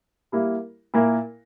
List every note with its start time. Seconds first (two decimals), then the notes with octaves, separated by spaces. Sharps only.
0.32 G3 A#3 E4 A#4
0.94 A#2 A#3 E4 A#4